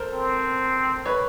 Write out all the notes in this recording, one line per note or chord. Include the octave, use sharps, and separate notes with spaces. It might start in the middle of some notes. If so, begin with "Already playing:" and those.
Already playing: A4 A#4 C5
C4
B4 C#5